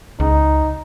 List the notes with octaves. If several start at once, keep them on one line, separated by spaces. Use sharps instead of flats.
C#2 D#4